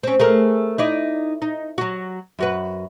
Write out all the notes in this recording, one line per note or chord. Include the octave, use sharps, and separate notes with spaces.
C4 C#4
A3 G#4 A#4
D#4 E4 D5
D#4
F#3 F#4
F#2 F#4 B4